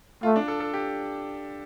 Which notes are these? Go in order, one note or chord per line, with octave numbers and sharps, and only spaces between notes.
A3 F4
D4
A4
A4
G4